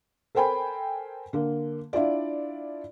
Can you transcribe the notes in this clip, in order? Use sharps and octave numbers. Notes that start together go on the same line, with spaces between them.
A4 A#4 C5 G5 G#5 B5
D3 A#3
D4 E4 F4 D5